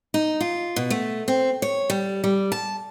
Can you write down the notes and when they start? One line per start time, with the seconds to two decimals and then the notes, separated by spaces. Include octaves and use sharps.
0.14 D#4
0.41 F4
0.76 B2
0.90 A3
1.28 C4
1.62 C#5
1.90 G3
2.24 G3
2.52 A5